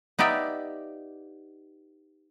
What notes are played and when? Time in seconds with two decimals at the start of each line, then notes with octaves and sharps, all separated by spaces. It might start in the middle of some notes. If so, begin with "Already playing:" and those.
0.19 B3 D#4 G4 D5 E5 G5